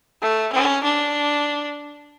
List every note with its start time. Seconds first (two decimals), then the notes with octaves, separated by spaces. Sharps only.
0.22 A3
0.53 C#4
0.84 D4